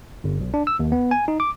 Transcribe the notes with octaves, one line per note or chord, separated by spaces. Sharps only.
G1
B1
D4
E6
D#2
B3
G#5
D#4
D6